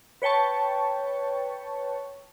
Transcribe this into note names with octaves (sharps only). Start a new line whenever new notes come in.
B4 C#5 G5 A5 C#6